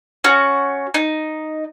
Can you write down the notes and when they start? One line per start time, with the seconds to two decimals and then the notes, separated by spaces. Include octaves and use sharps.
0.24 C#4 F#4
0.94 D#4